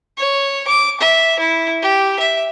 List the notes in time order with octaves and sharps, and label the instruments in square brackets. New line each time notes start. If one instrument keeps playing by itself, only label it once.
[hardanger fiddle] C#5
D6
E5
E4
G4
E5